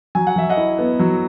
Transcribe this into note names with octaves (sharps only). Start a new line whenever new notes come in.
F#3 G#5
F#5
F#3 E5
D#5 F#5
E4
B3
F#3